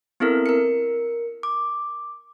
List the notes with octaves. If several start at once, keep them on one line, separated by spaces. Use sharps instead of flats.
B3 C4 E4 A4 A#4
A#4 C#7
D6